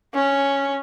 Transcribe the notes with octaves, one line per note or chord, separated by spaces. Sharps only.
C#4